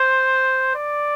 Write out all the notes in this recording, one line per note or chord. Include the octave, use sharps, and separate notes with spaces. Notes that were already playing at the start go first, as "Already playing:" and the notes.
Already playing: C5
D5